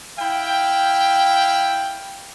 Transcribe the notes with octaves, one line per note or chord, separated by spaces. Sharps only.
E4 F5 G5